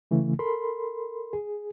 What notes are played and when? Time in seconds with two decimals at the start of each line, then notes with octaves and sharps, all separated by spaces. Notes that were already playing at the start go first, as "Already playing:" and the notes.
0.11 C#3 E3 A3
0.39 A4 A#4 B5 C6
1.33 G#4